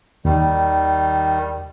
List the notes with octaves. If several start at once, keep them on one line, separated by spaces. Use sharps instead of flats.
D#2 D#3 G3